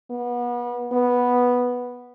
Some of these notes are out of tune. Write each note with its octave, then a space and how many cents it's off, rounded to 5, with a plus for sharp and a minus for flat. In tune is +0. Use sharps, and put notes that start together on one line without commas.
B3 -30
B3 -5